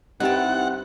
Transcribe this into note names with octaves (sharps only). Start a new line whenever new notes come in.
G2 C4 D#4 E4 G4 F#5 A5